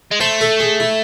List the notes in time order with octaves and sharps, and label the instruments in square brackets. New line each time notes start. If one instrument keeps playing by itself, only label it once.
[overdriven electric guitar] G#3
[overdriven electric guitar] A3 [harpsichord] C5
[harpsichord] A4
G#4
E4